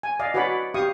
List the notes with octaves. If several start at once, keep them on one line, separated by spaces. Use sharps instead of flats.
G#5
D5 D#5 F5
F#4 B4 C#5 D5 F#5 B5
G4 F5 C#6 D#6